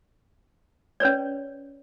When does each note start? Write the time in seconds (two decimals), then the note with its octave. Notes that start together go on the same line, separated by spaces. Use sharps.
1.00 C#4 B4 C#5 D5